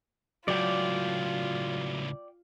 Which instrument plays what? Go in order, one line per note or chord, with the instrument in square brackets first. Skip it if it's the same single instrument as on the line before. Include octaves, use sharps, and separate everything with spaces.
[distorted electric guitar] C#2 A2 [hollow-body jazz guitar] F#3 [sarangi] F4 [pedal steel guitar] D5 G5